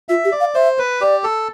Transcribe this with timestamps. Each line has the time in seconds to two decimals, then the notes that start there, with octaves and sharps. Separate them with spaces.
0.09 F4 E5
0.25 G4
0.32 D5
0.40 F5
0.54 C5 E5
0.79 B4
1.01 G4 D5
1.24 A4